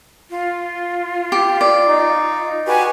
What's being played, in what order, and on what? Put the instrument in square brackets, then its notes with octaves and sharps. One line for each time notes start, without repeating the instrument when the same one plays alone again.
[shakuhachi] F4
[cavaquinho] G4
D5
[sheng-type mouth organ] D#4
[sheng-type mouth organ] F#4 G4 B4 [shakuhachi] G#5